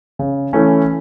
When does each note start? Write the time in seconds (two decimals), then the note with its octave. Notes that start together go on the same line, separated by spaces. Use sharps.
0.19 C#3
0.53 E3 A3 C#4